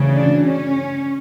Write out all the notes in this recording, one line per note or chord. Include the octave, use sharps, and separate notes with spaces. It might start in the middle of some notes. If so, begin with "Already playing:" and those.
Already playing: D2 C#3 E3
D4
C#4